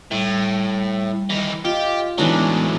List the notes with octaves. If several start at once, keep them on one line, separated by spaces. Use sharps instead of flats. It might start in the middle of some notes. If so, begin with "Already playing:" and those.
A2 G3
D#3 E3 A#5
F4 G4 D#5
A2 E3 F#3 G#3 B3 D4 D#4